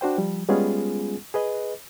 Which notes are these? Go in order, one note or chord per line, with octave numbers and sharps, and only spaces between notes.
D4 F#4 C5 G5
F3 G3
G3 G#3 B3 C#4 F4 G#4
G#4 B4 D#5